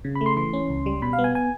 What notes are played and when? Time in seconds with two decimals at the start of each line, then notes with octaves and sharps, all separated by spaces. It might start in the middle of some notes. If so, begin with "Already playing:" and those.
0.05 C#3
0.15 B5
0.21 A3
0.26 C6
0.37 E3 C6
0.53 C#4
0.70 C#2
0.86 G3
1.02 B2 B5
1.13 F5
1.19 B3
1.24 G#5
1.35 G#5